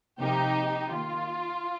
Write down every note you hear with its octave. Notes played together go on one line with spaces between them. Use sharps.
C3 F3 A#3 D#4 G4
D#3 A#3 F4